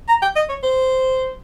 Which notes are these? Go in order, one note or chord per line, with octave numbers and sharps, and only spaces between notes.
A#5
G5
D#5
C#5
C5